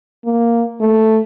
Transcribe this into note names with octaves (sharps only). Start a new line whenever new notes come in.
A#3
A3